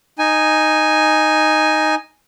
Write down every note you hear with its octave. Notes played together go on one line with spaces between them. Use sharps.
D#4 G#5